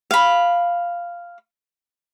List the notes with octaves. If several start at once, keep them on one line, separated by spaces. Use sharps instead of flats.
F5 B5